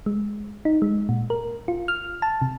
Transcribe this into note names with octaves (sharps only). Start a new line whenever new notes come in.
G#3
D#4
G#3
A#2
A#4
F4
F6
A5
C3